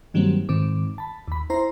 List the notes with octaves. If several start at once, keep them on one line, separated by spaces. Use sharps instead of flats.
G2 D#3 F#3 G3 A#3 C4
G#2 D#3 C4 D6
A5 B5
D#2 B5
E4 C5 A#5 C6